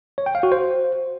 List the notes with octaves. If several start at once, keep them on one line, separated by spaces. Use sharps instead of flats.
C#5
G5
F5
F#4
C5